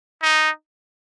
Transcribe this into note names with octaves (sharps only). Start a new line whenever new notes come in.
D#4